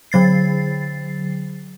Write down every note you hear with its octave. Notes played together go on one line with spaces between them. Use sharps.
D3 F#3 A6 C7